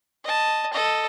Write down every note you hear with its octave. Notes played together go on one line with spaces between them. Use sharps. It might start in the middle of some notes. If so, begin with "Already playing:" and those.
D#5 A5
A4 D#5